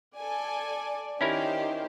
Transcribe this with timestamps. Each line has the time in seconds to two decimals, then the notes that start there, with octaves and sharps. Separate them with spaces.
0.17 A4 D5 G#5
1.21 D#3 C#4 E4 G4 A#4 C5